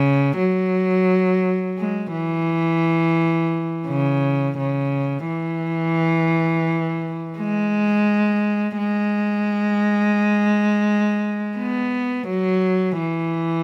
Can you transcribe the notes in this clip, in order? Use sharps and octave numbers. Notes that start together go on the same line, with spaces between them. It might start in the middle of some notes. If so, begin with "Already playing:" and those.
Already playing: C#3
F#3
G#3
E3
C#3
C#3
E3
G#3
G#3
B3
F#3
E3